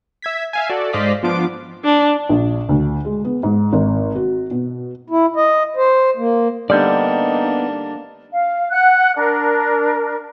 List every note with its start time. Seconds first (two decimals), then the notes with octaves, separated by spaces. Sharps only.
0.22 E5 G#6 B6
0.53 E5 F5 G#5
0.69 F#4 A4 D5
0.93 G#2 C5 D5 D#5 F5 B6
1.23 F3 B3 D4 F4 D6 D7
1.85 D4
2.29 A#1
2.69 D2
3.05 G#3
3.24 B3
3.43 G#2
3.73 G#1
4.15 F#4
4.51 B2
5.10 E4
5.36 D#5
5.77 C5
6.17 A#3
6.70 D3 G3 A#3 B3 D4 D#4 D5
8.32 F5
8.70 F#5 F#6
9.15 D4 A#4